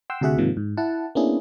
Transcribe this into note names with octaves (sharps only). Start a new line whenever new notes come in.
F#5 G5 C6 E6
D2 C3 F#4 G#4 E5 F#5
G#2 C3 D#3 F3 A#3
G#2
E4 F#5 A5
A#3 B3 C#4 D4 E4 G#4